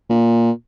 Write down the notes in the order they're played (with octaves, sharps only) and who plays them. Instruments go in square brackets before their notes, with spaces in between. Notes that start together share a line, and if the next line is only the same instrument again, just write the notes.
[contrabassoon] A#2